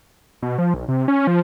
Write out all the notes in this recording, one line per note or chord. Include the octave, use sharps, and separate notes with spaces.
B2
F3
B1
C3
C#4
F3